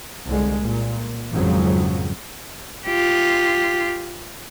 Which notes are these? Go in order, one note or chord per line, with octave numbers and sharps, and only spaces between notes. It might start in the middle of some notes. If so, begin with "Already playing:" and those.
C2 D3 G#3
A#2
G#1 F2 G#2 C#3 F3 F#3
F4 G4